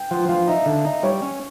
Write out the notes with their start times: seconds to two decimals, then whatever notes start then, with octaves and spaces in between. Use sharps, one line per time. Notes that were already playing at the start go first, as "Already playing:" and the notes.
Already playing: G5
0.11 F3 F#5
0.29 F3 F5
0.48 D#4 E5
0.66 D3
0.85 D#4
1.03 G3 C#5
1.22 C#4